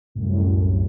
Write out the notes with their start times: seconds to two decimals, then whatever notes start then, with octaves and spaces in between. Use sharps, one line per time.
0.15 C2 F#2 A2